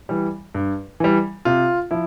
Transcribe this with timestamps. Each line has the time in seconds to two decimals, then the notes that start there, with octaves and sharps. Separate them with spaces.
0.09 E3 G3
0.55 G2
1.00 E3 G3
1.45 C3 F4
1.91 F3 E4